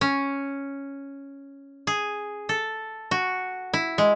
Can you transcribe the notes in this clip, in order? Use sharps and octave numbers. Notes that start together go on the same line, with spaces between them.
C#4
G#4
A4
F#4
E4
G#3